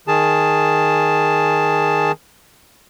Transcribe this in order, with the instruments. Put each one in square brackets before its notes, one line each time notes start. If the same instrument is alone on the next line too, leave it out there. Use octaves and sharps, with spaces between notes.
[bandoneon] D#3 G#4 A5